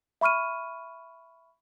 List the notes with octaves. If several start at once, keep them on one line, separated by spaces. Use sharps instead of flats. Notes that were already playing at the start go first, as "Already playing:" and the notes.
E5 B5 C#6 F6 D#7